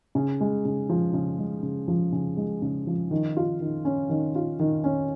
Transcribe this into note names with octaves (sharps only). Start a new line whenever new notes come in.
C#3
G#3
C#3
F3
C#3
G#3
C#3
F3
C#3
G#3
C#3
F3
D#3
F4
D#3
C#4
D#3
F4
D#3
C#4